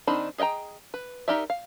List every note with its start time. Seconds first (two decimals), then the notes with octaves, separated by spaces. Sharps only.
0.07 D#3 C4 D4 D#4 B5
0.38 G#4 D#5 F5 G5 A#5
0.94 B4
1.28 D#4 G4 A#4 D5 E5
1.50 F5